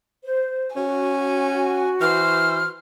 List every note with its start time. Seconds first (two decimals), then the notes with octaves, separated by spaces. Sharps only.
0.24 C5
0.76 C#4 F#4 G#5
2.01 E3 C5 F6